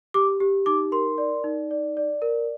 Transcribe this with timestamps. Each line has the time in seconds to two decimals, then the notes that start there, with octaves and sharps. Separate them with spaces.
0.14 G4 D6
0.40 G4
0.66 D#4 D6
0.92 A#4 C6
1.18 D5
1.44 D#4
1.71 D5
1.97 D5
2.22 A#4